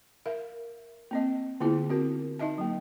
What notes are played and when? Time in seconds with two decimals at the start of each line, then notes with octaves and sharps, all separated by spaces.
0.26 A#4 E5 F5
1.11 A#3 C4 D#5
1.60 D3 A#3 B3 E4 F4 G#4
1.89 C4 F#4 A#4
2.39 D#4 D#5 E5 A5
2.58 F#3 A#3